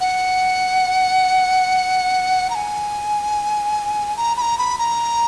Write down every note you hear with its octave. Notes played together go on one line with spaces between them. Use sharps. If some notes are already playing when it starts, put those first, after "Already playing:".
F#5
A#5
G#5
A#5
B5
A#5
B5
A#5